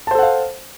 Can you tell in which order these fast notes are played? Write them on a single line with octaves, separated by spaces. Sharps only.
A5 C5 A4 F#5 F5